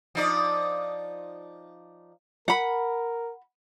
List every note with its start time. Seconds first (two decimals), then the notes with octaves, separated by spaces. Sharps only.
0.15 F3 D#4 D5
2.48 A#4 F#5 B5